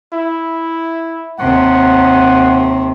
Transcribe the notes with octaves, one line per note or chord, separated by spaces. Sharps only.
E4
D#2 C3 F#5